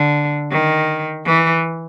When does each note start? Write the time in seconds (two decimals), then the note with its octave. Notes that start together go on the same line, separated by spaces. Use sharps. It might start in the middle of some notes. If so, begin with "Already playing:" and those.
Already playing: D3
0.51 D#3
1.25 E3